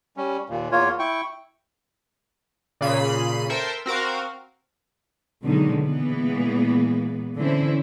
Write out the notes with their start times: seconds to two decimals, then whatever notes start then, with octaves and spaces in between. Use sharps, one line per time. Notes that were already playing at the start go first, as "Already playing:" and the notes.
0.17 G3 C#4
0.50 D#2 A#2
0.72 E2 A#3 F4 C#5
0.99 E4 G5 C#6
2.81 A#2 C#3 B5 C7 D#7
3.49 A4 A#4 C5 E5 G5
3.86 C4 F#4 A#4 F5
5.43 B2 D3 D#3 F#3 G#3 D#4
5.81 A#2 E3 G#3 A#3 B3
7.37 D3 E3 C4 C#4 E4 C5